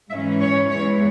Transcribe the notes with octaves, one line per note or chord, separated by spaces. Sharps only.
G#2 E3 C#4 E5
C#5
E2 E3 G#3 C#5